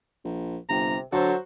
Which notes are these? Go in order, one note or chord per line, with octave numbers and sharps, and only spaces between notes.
A#1
G1 C3 A#5
D3 F#3 F#4 A4 C5